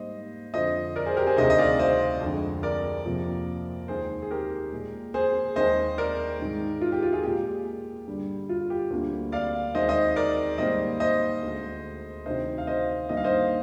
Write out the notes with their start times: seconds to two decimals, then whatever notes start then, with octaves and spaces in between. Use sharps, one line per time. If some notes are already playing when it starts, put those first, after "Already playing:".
Already playing: G#2 G3 A#3 C5 D#5
0.54 F2 D3 F3 C5 D#5
0.95 A#4 D5
1.06 G#4 C5
1.17 G4 A#4
1.27 G#4 C5
1.37 D2 C3 D#3 C5 D#5
1.50 D#5
1.59 D5 F5
1.79 C5 D#5
2.21 F2 D3 G#3
2.63 A#4 D5
3.05 F2 C3 F3 A#3
3.88 D#2 D#3 G#3 G#4 C5
4.22 G#4
4.31 G4 A#4
4.73 A#2 G#3
5.14 G#4 C5
5.56 D#2 D#3 G#3 C5 D#5
5.98 A#4 D5
6.39 G#2 D#3 G#3
6.81 F4
6.92 G4
7.03 F4
7.13 F4 G#4
7.23 A#2 G#3 G4
8.07 G2 D3 G3
8.49 F4
8.70 G4
8.90 D2 D3 G3 A#3
9.32 D5 F5
9.74 D#2 D#3 G#3 C5 D#5
9.89 C5 D#5
10.16 A#4 D5
10.58 G#2 D#3 G3 A#3 C5 D#5
11.00 C5 D#5
11.43 D2 D3 G#3
12.26 D2 C3 D#3 C5 D#5
12.58 F5
12.67 C5 D#5
13.09 G2 D#3 A#3 D#5
13.17 F5
13.24 C5 D#5